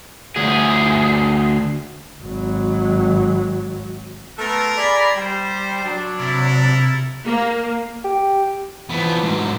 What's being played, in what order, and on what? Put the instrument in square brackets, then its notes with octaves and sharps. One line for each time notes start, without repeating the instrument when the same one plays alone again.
[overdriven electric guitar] D2 G#4
[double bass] G#1 F#3
[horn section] A3 B3 A4 [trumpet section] F4 A#4
[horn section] G#4 D5 B5
[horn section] G3 [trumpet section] C5
[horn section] F#3 D4
[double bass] C3 [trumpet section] E4 A4 A#4
[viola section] A#3
[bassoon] G4
[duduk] E3 [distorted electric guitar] F3 B3
[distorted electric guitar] G#2 F#3